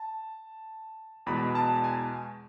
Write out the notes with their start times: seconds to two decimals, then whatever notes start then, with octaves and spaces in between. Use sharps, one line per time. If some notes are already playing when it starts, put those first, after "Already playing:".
Already playing: A5
1.26 E2 B2 G#3 B5
1.55 A5
1.84 G#5